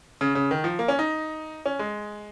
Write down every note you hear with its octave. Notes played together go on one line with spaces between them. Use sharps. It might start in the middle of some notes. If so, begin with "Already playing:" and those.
C#3
C#3
D#3
F3
A#3
C#4
D#4
C#4
G#3